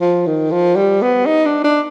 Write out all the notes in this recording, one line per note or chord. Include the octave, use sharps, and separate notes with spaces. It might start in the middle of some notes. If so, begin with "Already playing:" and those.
F3
D#3
F3
G3
B3
D#4
D4
D4